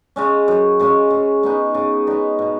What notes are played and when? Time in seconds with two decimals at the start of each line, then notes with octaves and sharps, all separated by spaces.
0.16 C#3 G#3 C#4
0.48 F#2
0.79 C#3 G#3 C#4
1.10 C#3
1.43 G#3 B3 D#4
1.74 C#3
2.07 G#3 B3 D#4
2.39 B2